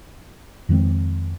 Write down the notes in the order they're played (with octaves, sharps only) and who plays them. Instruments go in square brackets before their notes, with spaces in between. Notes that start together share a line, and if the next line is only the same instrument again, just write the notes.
[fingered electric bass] F2 D#3 G#3 C4